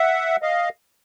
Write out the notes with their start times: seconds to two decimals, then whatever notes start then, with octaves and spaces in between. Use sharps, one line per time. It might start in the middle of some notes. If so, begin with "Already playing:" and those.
Already playing: E5 F#5
0.42 D#5 F5